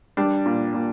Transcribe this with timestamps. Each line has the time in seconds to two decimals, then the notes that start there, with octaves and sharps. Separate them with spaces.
0.17 G3 D4
0.46 A#2
0.74 A#2